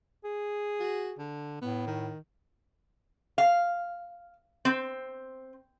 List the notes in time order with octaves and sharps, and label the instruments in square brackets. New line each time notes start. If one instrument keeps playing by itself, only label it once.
[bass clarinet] G#4
[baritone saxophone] F#4
D3
[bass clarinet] A2 [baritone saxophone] B3
[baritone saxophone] D#3
[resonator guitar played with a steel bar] F5
C4